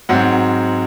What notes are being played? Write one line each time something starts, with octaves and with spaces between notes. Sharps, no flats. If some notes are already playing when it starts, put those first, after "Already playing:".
G#2 F#3 C4 F#5